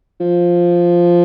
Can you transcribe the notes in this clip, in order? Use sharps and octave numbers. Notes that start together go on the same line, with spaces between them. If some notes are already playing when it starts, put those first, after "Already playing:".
F3